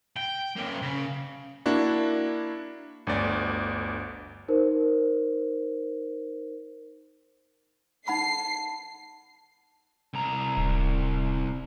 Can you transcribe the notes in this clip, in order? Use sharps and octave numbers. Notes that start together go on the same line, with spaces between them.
G5
A#3 C#4
C#3
A#3 D4 E4 F#4
G1 D2 D5
D#4 A#4 C5
D#4 F#5 A5 B5 C7
C2 A#5
D1